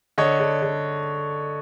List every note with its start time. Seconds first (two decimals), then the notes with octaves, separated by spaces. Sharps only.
0.18 D3 C#5 D#5
0.40 D3
0.62 D3